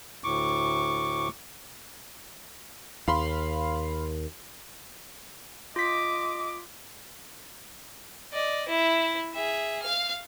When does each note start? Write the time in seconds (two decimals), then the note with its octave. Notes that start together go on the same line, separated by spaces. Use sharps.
0.24 D2 A2 C#6 D6
3.08 D#2 F5 B5 C6
5.76 F4 D#5 D6 B6
8.32 D5 D#5
8.69 E4 E5
9.35 G#4 E5
9.83 F5 F6